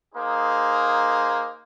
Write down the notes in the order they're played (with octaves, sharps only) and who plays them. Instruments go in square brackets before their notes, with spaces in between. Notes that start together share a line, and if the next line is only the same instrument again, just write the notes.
[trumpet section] A#3 D#4 G#4 C5